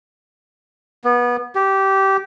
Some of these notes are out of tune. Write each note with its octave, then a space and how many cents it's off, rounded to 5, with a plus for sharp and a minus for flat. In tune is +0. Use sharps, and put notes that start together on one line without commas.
B3 -25
G4 -15